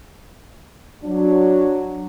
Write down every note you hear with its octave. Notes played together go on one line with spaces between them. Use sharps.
F#3 D4